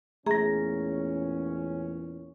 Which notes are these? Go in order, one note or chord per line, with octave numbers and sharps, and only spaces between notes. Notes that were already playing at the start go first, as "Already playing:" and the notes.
E2 A#2 A3 C#4 G#4 A#5 A#6